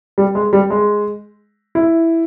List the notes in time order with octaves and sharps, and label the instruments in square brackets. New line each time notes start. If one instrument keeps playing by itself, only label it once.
[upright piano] G3
G#3
G3
G#3
E4